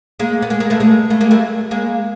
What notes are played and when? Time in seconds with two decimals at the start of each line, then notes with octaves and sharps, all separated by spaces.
0.20 G#3 A#3
0.42 B3
0.50 G#3 A#3
0.60 G#3 A#3
0.70 A3 B3
0.80 G#3 A#3
1.10 A3 B3
1.21 G#3 A#3
1.31 G3 A3
1.71 G#3 A#3